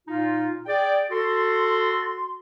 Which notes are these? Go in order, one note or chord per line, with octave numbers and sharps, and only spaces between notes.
A#2 D#4 F4
G#4 D5 G5
F#4 A4 C6